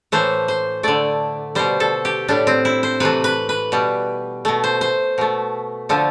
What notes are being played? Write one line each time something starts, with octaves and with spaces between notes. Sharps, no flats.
A2 E3 A3 C5
C5
D3 A3 D5
B2 G3 C5
A4
G4
A2 G3 D4
C4
E4
C5
C3 E3 A3 B4
B4
B4
B2 G3
B2 A3
C5
C5
B2 A3
D3 F3 A3